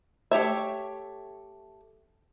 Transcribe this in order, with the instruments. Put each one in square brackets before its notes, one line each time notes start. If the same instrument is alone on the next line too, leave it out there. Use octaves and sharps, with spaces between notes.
[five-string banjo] A3 G4 C#5 E5